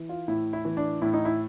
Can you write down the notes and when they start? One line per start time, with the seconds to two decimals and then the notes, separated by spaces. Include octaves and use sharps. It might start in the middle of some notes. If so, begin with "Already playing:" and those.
Already playing: E3
0.09 F4
0.28 A2 E4
0.53 E4
0.65 E3
0.77 D4
1.02 A2 E4
1.13 D#4
1.25 E4